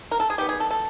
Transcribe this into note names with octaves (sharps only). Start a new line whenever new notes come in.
A#4
A4
G#4
D#3 G3 B3 G4
G#4
A4
A4